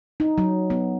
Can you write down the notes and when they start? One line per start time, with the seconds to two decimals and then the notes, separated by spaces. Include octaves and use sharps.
0.20 D#4
0.38 F#3
0.70 B3